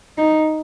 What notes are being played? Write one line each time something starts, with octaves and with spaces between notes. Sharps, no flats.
D#4